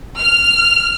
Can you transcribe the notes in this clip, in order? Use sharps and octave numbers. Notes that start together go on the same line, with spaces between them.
F6